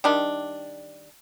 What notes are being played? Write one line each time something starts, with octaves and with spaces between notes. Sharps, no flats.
D#3 G3 D4